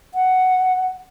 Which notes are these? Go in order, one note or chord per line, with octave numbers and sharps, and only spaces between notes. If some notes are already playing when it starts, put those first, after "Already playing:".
F#5